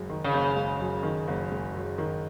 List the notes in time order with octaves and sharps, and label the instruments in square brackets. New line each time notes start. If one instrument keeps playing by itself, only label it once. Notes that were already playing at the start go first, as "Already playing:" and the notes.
Already playing: [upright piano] F#1 F#2 G#3
D#3
[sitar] C#3
[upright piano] F#1
G#3
F#2
D#3
F#1
G#3
F#2
D#3